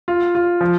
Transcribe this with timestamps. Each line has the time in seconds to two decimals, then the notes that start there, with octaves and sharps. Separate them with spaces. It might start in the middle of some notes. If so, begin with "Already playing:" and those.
0.08 F4
0.35 F4
0.61 F3